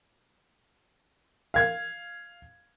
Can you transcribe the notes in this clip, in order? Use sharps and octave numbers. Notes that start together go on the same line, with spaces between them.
F5 G#6